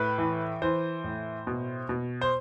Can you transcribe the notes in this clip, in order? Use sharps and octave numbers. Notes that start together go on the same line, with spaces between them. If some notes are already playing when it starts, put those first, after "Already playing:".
Already playing: A2 B4
E3
E3 C5
A2
B2
B2
C5